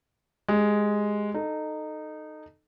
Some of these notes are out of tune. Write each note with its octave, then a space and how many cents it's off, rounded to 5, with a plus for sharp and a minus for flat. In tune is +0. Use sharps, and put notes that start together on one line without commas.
G#3 +0 G4 +10
D#4 -15 A4 +0